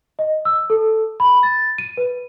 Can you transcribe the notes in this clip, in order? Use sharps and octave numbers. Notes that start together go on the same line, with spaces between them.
D#5
E6
A4
B5
A6
D#7
B4